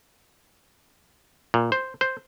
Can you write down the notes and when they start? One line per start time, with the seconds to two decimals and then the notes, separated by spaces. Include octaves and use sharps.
1.54 A#2
1.72 C5
2.01 C5